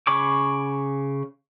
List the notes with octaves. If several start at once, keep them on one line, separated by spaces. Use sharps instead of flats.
C#3 C#5 B5 C#6 D6